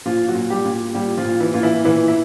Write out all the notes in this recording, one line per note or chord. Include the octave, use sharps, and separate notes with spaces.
A#2 F3 F4
F#3 F#4
A#2
G3 G4
A#2
A#2 G3 G4
F3 F4
A#2
E3 E4
A#2 F4
E3 E4
A#2 E3 E4
E4